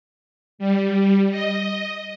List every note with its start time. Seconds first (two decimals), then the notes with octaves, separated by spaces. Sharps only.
0.59 G3
1.30 D#5